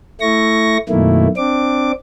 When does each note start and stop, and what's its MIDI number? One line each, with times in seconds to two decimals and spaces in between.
0.21 0.77 57
0.21 0.77 64
0.21 0.77 85
0.21 0.77 94
0.89 1.27 42
0.89 1.27 47
0.89 1.27 51
0.89 1.27 57
0.89 1.27 58
0.89 1.27 64
1.37 1.92 60
1.37 1.92 62
1.37 1.92 86